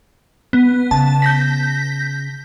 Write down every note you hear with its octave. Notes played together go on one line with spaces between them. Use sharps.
B3
C#3 A5
G6 A#6 B6